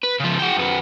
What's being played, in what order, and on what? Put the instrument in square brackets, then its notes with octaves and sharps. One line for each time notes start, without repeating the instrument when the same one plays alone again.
[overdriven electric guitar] B4
C#3 F3
F#4 G5
F#2 B3